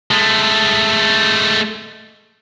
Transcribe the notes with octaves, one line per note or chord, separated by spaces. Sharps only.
G#3 A3